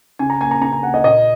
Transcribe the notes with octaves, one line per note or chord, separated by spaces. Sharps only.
C#3 G#5
A#5
A#3 G#5
A#5
C#3 A#5
G#5
A#3 F#5
D#5
A#2 D#5